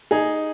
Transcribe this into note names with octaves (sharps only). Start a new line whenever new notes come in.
D#4 G#4